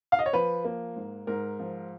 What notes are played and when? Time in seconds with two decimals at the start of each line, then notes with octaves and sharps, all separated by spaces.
0.12 F5
0.19 D#5
0.26 C#5
0.33 F3 B4
0.65 A#3
0.96 G#2
1.27 G#2 A#4
1.59 F3